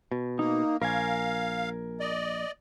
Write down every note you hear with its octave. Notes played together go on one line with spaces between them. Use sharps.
B2
A#3 D#4
A#1 A#4 F5 G#5
D5 D#5